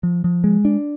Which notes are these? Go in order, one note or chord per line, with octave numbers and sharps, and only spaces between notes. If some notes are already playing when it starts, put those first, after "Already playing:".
F3
F3
G#3
D4